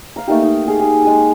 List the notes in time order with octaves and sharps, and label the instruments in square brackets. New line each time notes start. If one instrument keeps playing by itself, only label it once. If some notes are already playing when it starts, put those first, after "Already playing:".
[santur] F5 A#5
A3 A#3 D#4 G4
D#4
G#4 F5
G4 G#4
G#3 G#5